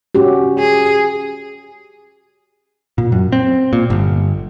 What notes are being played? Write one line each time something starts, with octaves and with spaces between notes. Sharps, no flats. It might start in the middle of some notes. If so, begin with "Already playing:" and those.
C#4 F#4 G4
G#4
A#2
F#2
C4
A#2
G1